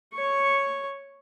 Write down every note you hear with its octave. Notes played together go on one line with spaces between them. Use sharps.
C#5 C#6